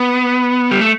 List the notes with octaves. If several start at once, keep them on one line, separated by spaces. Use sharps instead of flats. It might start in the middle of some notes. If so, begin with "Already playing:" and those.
Already playing: B3
G3
A3